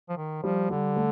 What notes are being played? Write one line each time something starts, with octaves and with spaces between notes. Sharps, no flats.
F3
D#3
F3 G3
D3 G3
A3